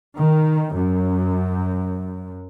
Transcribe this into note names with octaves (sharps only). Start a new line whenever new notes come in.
D#3
F#2